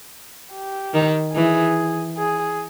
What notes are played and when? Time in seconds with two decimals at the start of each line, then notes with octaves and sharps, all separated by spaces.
0.53 G4
0.94 D#3
1.35 E3 G#4
2.17 G#4